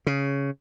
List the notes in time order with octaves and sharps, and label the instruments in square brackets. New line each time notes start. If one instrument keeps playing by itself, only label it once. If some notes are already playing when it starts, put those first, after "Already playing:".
[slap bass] C#3